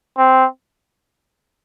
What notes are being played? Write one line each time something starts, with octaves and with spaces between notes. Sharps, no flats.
C4